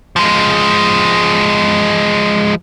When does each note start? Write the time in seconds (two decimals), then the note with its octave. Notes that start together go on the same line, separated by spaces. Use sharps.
0.16 F3 G#3